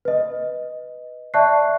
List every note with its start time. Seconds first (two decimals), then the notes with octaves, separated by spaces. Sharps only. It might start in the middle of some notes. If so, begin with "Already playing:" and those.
0.05 B4 D#5
1.34 D5 E5 A5 C#6 F#6 C7